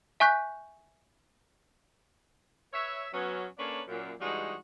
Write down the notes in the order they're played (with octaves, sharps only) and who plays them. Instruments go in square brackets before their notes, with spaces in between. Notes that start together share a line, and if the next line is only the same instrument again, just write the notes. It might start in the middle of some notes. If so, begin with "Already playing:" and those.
[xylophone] E5 G#5 C#6 F#6 G6 B6
[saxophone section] B4 C#5 E5
F#3 B3 C#4
A#3 C#4 D4 A4 B4 C#5
F#2 A#2
G2 E3 G3 G#3 D#4 F#4